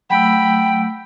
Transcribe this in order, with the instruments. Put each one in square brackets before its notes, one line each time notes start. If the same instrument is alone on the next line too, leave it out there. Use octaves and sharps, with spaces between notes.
[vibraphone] F#3 A3 E6 [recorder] G5 [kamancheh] B5